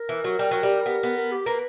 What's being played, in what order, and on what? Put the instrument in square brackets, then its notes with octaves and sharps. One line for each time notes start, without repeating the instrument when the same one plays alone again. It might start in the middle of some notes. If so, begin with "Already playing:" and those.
Already playing: [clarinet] A#4
[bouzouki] E3
F#3
G3
F#3
G3
B3
B3
[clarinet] A#4
G4
[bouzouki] A#3 [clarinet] B4